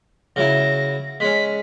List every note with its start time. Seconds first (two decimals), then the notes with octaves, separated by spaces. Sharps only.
0.36 C#3 F#3 E4 A#6
1.20 G#3 C#4 B6